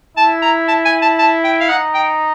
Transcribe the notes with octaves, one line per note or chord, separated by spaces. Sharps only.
E4 A5
A#5
A5
G#5
A5
A5
G5
F5
D#4 F#5
G5